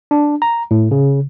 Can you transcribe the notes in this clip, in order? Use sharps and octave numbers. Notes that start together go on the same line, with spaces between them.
D4
A#5
A2
C#3